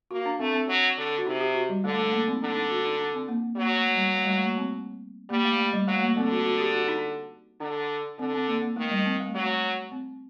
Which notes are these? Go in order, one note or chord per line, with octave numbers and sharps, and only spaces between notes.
A#3 F#4
D4
A3 C4
C4
F#3
D3
F#4
C3 D#4
G4
F#4
G3
D3 A3
A3
A#3
C4
D#4
D3 D4
D#4
F#4
D#4
D4
C4
A#3
F#3 A#3
A3
G3
A3
G3
A3
A#3
C4
G3 A#3
A3
A3
G3
F#3 A3
A#3
D3 C4
F#4
F#4
G4
F#4
D#4
D3 D4
D3 C4
C4
A#3
A#3
D#3 A3
G3
C4
A3
F#3 A3
C4